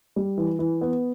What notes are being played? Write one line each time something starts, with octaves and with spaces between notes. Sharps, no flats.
G3
E3
E3
B3